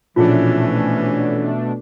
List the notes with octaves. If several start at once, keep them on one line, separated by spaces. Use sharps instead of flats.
A#1 B2 E3 A3 C#4 D4 F4 G#4